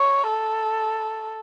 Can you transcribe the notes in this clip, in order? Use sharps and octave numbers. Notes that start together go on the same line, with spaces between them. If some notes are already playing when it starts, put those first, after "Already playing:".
Already playing: C#5
A4